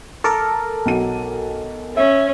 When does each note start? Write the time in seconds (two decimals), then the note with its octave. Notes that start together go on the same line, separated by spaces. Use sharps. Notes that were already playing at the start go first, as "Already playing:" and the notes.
0.24 A4 A#4 D6
0.86 B1 F#3 D#7
1.97 C#4 E5